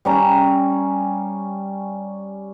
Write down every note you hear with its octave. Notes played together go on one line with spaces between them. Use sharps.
G3 C#4 A#5